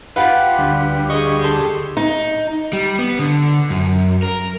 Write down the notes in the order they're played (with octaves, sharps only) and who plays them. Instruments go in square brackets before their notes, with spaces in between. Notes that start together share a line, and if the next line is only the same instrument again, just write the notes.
[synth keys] F4 G4 B4 [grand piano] F5 F#5 B5
[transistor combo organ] D2 D3 G3
[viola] G4 G#4 [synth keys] D#5 C#6
[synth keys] A4 C6
[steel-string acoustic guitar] D#4
[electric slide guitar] G3
B3
D3
F#2
A#4